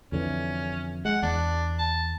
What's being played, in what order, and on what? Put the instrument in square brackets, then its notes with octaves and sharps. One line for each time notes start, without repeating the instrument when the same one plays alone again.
[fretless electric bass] F2 D3 E3 [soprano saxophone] C#4
[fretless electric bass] G#3 [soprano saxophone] F#5
[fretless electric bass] E2 [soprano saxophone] D4
[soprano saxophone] A5